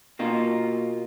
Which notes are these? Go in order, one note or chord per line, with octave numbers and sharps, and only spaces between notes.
B2 A#3 D#4 F4